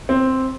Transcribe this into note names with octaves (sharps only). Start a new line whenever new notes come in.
C4